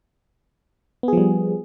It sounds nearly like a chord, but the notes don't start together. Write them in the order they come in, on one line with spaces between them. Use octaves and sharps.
B3 G#4 F3 G3